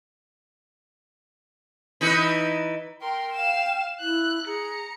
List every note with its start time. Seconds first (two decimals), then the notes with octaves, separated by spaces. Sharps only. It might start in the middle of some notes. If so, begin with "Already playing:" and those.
2.01 E3 D#4 B4
3.01 A#4 G5 C6
3.32 F5 E7
4.00 E4 F#6
4.46 G#4 A#5 C#7